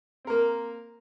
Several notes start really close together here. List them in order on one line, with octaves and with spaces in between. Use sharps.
C4 A#4 A#3